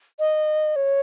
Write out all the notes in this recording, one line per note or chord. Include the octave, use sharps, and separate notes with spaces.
D#5
C#5